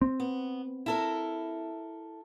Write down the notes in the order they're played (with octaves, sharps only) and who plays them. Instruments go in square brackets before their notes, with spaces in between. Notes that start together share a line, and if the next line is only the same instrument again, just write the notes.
[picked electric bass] C4
[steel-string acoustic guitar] B3
E4 A4 A#4